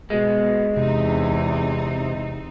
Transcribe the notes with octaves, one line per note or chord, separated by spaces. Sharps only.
B2 G#3
E2 C3 C4 D#4